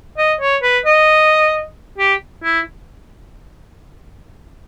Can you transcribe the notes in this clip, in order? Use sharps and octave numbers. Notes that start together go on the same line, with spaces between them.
D#5
C#5
B4
D#5
G4
E4